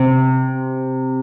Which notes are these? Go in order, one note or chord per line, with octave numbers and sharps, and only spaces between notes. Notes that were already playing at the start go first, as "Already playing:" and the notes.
Already playing: C3